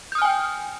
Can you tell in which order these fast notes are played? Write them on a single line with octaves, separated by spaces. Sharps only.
G6 D#6 F6 G#5 G5